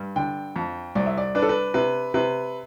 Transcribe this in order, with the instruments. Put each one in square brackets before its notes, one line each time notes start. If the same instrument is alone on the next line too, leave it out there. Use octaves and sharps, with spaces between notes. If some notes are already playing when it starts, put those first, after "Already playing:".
Already playing: [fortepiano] G2
[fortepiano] D3 [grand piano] G5
[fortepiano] F2
[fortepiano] C2 [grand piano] D5
[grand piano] E5
D5
[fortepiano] D4 [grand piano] B4
[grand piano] A4
B4
[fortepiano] C3 [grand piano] B4
[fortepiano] C3 [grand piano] B4